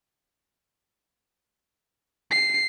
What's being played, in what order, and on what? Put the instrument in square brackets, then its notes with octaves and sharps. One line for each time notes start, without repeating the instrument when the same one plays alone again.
[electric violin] C7